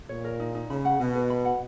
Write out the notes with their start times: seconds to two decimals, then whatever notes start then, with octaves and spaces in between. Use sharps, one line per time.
0.09 A#2 C#5
0.24 A#4
0.40 D#4
0.55 D#4
0.70 C#3 B5
0.85 F#5
1.00 B2 B4
1.15 B4
1.30 B5
1.45 F#5